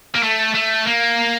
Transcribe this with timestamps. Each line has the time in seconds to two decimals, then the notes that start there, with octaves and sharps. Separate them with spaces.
0.15 A#3
0.23 A3
0.55 A3
0.87 A#3